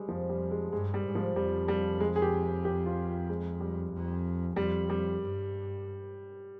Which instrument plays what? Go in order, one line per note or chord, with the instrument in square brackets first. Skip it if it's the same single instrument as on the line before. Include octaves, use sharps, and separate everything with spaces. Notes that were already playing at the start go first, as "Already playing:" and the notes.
Already playing: [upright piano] G3 G#3
[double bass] F2 [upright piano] F3
[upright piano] G3
G#3
[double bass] G2 [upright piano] G#3
[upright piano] G3
[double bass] G#2
[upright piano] F3
[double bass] F2 [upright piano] G3
[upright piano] G3
G#3
G#4
G4
G4
F4
G#3
G3
[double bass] F2
[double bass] F2 [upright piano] G3
[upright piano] G3
[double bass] G2